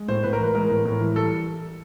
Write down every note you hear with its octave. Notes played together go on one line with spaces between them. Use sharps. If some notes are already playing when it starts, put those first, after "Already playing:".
Already playing: G#3
A2 C5
A2 B4
A#4
E3 B4
G#3 A#4
A2
A2
E3
G3 A4